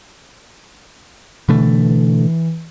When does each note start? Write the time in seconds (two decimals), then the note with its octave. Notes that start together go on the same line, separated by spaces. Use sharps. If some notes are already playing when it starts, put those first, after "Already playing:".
1.49 B2 D3 E3 A3